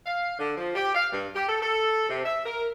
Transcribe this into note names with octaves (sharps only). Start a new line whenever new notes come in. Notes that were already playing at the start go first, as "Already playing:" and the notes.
F5
D3
F3
G4
F5
G2
G4
A4
A4
C3
E5
A#4